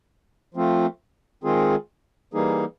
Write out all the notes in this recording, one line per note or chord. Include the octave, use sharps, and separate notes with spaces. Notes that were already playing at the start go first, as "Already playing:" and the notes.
F3 A3 C4 F4
D#3 G#3 C4 F4 G#4
E3 G3 A#3 D#4 G#4